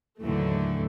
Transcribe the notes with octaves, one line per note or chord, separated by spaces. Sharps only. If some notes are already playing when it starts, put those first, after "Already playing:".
D#2 A2 D3 E3 F#3 A3